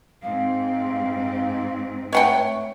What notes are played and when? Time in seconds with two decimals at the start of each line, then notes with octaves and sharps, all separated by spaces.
0.22 G#2 C4 F5
2.13 A3 C#5 F#5 G5